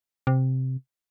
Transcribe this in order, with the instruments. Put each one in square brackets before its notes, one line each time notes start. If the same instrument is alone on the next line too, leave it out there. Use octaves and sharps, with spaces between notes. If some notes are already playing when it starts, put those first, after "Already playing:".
[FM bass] C3